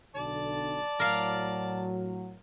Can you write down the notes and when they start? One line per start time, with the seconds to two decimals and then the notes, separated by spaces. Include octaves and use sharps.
0.15 B1 D3 D5 A5
1.00 A2 F#3 A#4 F5